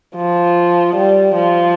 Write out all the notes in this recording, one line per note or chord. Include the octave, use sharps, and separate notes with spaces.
F3
G3
F3